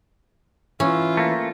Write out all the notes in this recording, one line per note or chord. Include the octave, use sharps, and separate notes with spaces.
E3 C#4 F4
A3 A#3